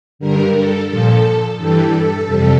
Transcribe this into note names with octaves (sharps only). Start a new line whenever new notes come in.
G2 D3 G3 A#4
A4
A#2 F3 A4
G2 E3 G3 A4
F2 C3 G3